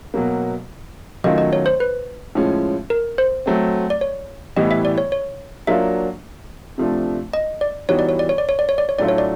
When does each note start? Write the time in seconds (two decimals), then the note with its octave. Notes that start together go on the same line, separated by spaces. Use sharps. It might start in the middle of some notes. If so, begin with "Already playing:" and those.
0.14 B2 F#3 A#3
1.24 D#3 F#3 A3 C#4 F4 D#5
1.38 D#5
1.53 C#5
1.66 C5
1.80 B4
2.35 A2 F3 G#3 C#4
2.90 A#4
3.18 C5
3.46 F#3 A3 C4
3.90 D5
4.01 C#5
4.57 A2 E3 G3 B3 D#5
4.71 E5
4.85 D5
4.98 C#5
5.12 C#5
5.67 F#3 A#3 D4 F4 E5
6.78 C3 F3 A3 D4
7.33 D#5
7.61 D5
7.89 E3 G3 B3 D#4 F#4 C#5
7.99 D5
8.09 C#5
8.19 D5
8.29 C#5
8.38 D5
8.49 C#5
8.59 D5
8.69 C#5
8.78 D5
8.89 C#5
8.99 A2 F#3 A3 D4 F4 D5
9.08 C#5
9.18 D5